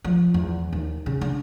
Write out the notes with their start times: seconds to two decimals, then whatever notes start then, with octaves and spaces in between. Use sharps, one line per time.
0.04 F3
0.34 E2
0.73 D#2
1.06 C#3
1.21 D4